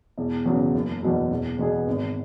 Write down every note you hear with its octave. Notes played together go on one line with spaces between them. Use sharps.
E1
E2 C#3 F#3
F#1
E2 B2 F#3
E1
E2 B2 B3 G#4
G#1